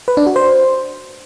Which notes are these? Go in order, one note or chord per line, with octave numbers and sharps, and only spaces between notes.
B4
D4
F#4
C5